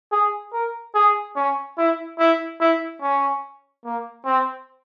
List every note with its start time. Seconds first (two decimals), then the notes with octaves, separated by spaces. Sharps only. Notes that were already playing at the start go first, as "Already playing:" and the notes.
0.12 G#4
0.53 A#4
0.95 G#4
1.36 C#4
1.78 E4
2.19 E4
2.61 E4
3.02 C#4
3.84 A#3
4.26 C4